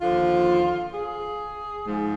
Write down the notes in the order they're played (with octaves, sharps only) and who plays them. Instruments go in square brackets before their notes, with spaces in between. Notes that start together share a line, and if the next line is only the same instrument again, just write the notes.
[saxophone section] D#2 D3 F3 F4
G#4
G#2 F3